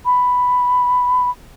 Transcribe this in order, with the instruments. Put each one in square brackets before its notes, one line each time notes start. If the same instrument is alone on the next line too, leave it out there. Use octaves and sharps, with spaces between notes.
[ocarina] B5